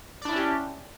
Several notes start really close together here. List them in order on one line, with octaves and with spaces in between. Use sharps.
D5 D4 E4 C#4 G4